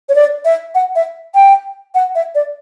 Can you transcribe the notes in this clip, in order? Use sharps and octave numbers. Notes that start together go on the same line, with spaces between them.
C#5
D5
E5
F#5
E5
G5
F#5
E5
D5